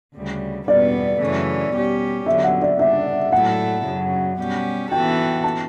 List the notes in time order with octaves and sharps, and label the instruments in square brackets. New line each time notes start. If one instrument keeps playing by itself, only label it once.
[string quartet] D2 C#3 G3
[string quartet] E2 B2 G3 B3 [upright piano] D5
[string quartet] F#2 C#3 E3 A3 C#4
E2 B2 G3 C#4 G4
[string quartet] E2 D3 F#3 [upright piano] E5
[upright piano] F#5
D5
[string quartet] C#3 G3 D4 [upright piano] E5
[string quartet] A2 F#3 A3 E4 A4 [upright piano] F#5
[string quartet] F#2 C#3 F#3
B2 G3 C#4 G4
[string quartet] E3 B3 F#4 A4 [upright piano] G5
[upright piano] A5